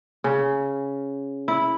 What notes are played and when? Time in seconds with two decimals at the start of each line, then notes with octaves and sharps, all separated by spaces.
0.24 C#3
1.48 E4